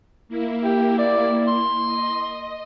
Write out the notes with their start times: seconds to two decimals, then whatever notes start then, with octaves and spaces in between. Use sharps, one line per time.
0.28 A#3 E4
0.63 G4
0.98 D5
1.47 C6
1.86 D#5